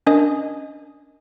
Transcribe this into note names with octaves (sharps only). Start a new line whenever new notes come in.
C#4 D4 A#4 D#5 G#5 D#6